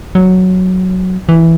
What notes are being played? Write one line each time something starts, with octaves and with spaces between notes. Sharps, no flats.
F#3
E3